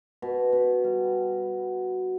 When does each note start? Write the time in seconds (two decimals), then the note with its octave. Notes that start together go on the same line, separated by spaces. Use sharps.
0.22 B2
0.53 B2
0.84 G3